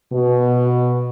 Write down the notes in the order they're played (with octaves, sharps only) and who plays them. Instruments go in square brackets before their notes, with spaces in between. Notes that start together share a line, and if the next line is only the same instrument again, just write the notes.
[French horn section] B2